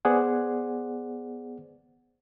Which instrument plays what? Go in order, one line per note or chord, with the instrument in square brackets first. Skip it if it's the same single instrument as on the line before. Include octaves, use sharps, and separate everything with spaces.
[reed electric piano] B3 G#4 C5 D5 F#5